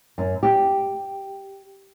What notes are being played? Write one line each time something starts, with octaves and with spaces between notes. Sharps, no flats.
F#2
G4